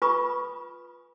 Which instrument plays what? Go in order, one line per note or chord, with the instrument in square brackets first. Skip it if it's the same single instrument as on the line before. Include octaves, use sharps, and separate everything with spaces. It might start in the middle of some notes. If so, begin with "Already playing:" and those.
[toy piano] F4 B4 G#5 B5 C#6 D#6